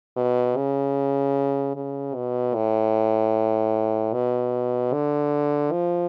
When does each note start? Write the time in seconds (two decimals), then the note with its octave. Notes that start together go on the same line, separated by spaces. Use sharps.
0.17 B2
0.57 C#3
1.75 C#3
2.15 B2
2.55 A2
4.13 B2
4.93 D3
5.72 F3